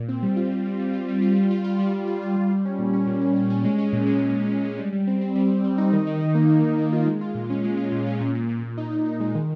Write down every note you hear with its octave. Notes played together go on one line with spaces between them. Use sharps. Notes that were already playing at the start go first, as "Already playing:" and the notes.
Already playing: A#2
C4
G3
F4
C4
G3
G3
F4
G3
F4
G3
F4
F4
G3
F4
F4
F4
G3
G3
C#4
A#2
C#4
A#2
C#4
C#4
C#4
G#3
C#4
A#2
G#3
G#3
A#2
G#3
G#3
G3
G3
C4
C4
G3
G3
G3
D#4
D#3
D#3
D#3
A#3
A#3
D#3
D#3
F4
G#3
F4
A#2
C#4
G#3
F4
A#2
C#4
A#2
A#2
A#2
A#2
D#4
D#4
D#4
G#3
D#3